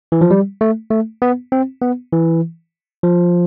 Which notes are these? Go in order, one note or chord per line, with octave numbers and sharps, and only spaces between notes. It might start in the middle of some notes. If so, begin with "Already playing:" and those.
E3
F3
G3
A3
A3
B3
C4
B3
E3
F3